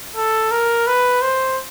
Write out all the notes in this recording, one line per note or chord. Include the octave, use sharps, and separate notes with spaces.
A4
A#4
B4
C5